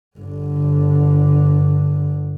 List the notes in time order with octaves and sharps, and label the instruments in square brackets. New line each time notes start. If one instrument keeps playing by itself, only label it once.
[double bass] G1 D3